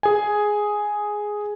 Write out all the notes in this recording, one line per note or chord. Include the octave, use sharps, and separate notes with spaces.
G#4 G#5